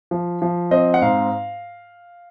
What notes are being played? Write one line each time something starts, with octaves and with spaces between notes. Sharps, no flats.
F3
F3
C4 D#5
F#5
G#2 F5